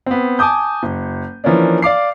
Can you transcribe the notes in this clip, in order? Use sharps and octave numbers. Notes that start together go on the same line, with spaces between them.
B3 C4
G#5 A5 D6 D#6 G6
F#1
E3 F3 A#3 C#4 D4
D5 F5 D6 C7